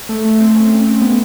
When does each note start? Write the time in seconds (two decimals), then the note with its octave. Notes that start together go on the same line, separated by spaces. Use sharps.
0.09 A3
0.25 A3
0.41 C4
0.56 C#4
0.71 C#4
0.87 C4
1.02 B3